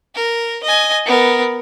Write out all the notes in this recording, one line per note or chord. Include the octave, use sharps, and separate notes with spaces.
A#4
D#5 G#5
B3 A#4